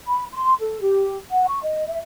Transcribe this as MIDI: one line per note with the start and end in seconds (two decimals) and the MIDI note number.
0.07 0.25 83
0.32 0.53 84
0.60 0.78 69
0.82 1.18 67
1.31 1.46 78
1.47 1.61 85
1.63 1.85 75
1.88 1.98 76